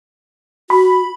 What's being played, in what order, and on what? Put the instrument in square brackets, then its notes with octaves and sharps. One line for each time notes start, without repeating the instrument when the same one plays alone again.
[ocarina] F#4 [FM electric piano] B5